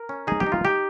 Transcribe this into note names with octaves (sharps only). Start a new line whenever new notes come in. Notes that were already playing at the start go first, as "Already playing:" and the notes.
Already playing: A#4
C#4
D#4 G#4
G4
D#4
F4
D#4 G4